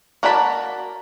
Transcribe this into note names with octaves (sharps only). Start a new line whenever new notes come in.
A#3 F#4 D5 A5 B5